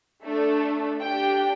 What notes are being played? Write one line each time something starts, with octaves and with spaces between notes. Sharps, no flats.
A3 D4 A4
D4 G4 G5